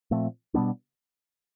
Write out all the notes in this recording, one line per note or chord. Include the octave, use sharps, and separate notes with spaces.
A#2 F3 A3 C4
B2 G3 B3 D4